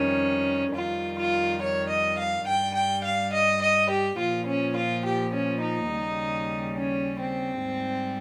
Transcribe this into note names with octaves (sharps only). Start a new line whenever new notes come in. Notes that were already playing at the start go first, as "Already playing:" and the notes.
Already playing: F2 D#3 G3 C#4
F2 D#3 G3 F4
F4
C#5
D#5
F5
G2 G3 G5
G5
F5
D#5
D#5
G4
A#2 F3 F4
C#4
F4
G4
C#4
D#4
D#2 C#3 G3
C#4
C4
G#2 G3